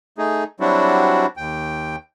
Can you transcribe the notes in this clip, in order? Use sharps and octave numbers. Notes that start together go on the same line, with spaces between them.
A3 D#4 G#4
F#3 G3 C4 D4 E4 F#4
D#2 G5